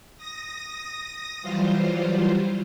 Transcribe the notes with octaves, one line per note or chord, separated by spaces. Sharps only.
D#6 A#6
E3 F#3 G3 F4 C5